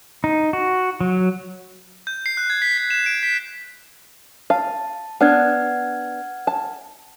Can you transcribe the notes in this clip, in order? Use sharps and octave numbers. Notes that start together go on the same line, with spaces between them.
D#4
F#4
F#3
G6
C7
F#6
G#6
B6
B6
E7
D7
B6
F5 A5
B3 D4 F#5 F6 G#6
A5